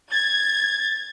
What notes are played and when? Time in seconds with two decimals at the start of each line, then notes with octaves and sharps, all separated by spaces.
0.12 G#6 A6